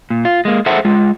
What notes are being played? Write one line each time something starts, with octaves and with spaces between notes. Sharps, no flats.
A#2
F4
G#3 A#3
G#4 A4 C5 E5 F#5 A5
G#3 F4